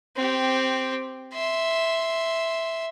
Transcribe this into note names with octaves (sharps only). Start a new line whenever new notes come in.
C4 G4
E5 C6